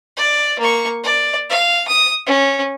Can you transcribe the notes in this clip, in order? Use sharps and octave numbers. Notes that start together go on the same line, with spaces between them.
D5
A#3 C#6
D5
F5
D#6
C#4